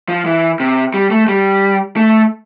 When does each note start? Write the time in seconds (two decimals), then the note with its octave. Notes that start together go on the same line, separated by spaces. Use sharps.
0.09 F3
0.26 E3
0.60 C3
0.94 G3
1.11 A3
1.28 G3
1.97 A3